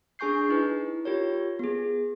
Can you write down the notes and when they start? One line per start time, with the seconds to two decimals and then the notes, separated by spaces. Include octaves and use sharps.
0.19 D4 G#4 G#5 C#6 G6 C7
0.49 D#4 E4 B4
1.05 F4 G4 A#4 C#5
1.59 B3 G#4